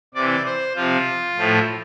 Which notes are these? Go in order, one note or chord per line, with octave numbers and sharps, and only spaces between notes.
C3 E3 D5
C5
C3 F3 F4
A2 F3